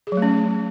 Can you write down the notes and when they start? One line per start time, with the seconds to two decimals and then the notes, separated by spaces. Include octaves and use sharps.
0.07 G#4
0.12 F#3
0.17 A3
0.22 C#4